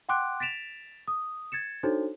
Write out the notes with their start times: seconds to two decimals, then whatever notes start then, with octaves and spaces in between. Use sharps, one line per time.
0.09 F#5 G5 C6 D6 F#6 D7
0.40 A6 B6 D7 E7 F7
1.08 D#6
1.52 G#6 A6 C#7 E7
1.83 D4 D#4 F#4 A4 C5 C#5